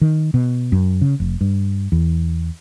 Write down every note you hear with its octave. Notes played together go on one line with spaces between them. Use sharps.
D#3
B2
F#2
C#3
F1
G2
E2